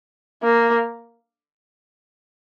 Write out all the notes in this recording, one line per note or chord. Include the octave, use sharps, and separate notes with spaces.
A#3